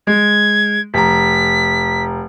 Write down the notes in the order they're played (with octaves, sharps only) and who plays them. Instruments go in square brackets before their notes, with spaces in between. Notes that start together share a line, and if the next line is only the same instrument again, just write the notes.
[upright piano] G#3 [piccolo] G#6
[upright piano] F1 A#5 [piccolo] B6